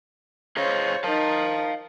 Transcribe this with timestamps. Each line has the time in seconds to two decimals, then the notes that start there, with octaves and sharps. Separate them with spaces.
0.57 G#4 C5 C#5 D#5 F5
1.04 D#4 A#4 F5 A5